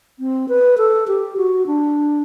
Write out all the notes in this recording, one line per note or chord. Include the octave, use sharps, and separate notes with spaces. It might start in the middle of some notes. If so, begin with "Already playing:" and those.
C4
B4
A4
G4
F#4
D4